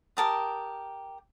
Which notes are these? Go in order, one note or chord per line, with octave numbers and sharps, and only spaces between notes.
G4 A#4 A5 D#6